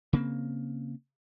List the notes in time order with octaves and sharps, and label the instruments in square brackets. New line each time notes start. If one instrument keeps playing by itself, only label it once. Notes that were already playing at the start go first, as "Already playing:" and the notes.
[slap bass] C#3 A#3 C4